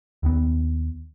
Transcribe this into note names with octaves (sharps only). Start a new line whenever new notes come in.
D#2 D#3 B3